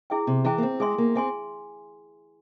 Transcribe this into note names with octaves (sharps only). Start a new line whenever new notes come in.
E4 G#4 E5 G5
C3
E3 E4 G#4 E5 G5
A#3
C4
G#3 G#4 E5 G#5 C6
A#3
C4 G#4 E5 G#5 C6